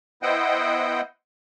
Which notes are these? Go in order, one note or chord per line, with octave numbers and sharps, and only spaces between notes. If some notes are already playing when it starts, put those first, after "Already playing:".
B3 E4 C5 D#5 F#5 G5